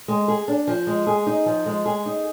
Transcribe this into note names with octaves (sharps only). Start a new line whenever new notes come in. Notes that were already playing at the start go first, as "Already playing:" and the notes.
G#3
G#4
D4
F3
G#3
G#4
D#4
F3
G#3
G#4
D#4